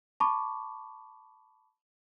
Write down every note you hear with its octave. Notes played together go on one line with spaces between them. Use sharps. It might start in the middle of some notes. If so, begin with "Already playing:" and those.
A5 B5 C#6 D6